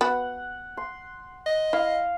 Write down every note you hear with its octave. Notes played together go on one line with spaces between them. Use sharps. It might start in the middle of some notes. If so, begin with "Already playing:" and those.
B3 F#4 B4 F#5
C6
D#5
E4 F5